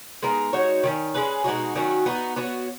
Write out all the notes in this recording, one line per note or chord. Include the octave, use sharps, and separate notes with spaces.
G#3 B3 D#4 A#4
G#3 D#4 F#4 C#5
D#3 A#3 C#4
G#3 C#4 G#4 B4
B2 G#3 D#4 F#4
D#3 F#3 C#4 F#4
B3 D#4 F#4
B3 F#4 C#5